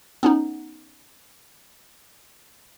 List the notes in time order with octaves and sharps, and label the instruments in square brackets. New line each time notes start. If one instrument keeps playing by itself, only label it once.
[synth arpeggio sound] B3 C#4 D#4